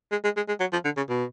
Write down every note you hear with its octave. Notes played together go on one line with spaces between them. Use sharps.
G#3
G#3
G#3
G#3
F#3
F3
D3
C#3
B2